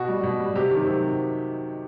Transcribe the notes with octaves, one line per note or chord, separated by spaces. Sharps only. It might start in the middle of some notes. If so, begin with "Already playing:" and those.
Already playing: B2 F#4
G3
B2
G3
C3 G4
D#3 F#3
C3